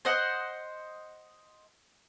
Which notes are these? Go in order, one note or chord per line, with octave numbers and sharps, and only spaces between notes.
C5 D#5 F#5